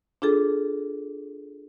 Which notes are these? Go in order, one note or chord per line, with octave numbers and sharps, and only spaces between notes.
D4 F4 G#4 A4